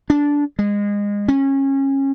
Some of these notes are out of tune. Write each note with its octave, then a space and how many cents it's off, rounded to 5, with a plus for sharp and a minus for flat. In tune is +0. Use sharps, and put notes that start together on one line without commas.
D4 -15
G#3 -25
C#4 -25